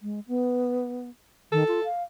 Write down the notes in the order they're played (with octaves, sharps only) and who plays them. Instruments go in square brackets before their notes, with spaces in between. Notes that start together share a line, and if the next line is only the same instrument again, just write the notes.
[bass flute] G#3
B3
[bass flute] D#3 [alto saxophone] A4
[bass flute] F4
F5